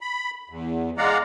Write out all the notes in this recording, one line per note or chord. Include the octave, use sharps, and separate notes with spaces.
B5
E2
G#3 D5 F5 F#5 A#5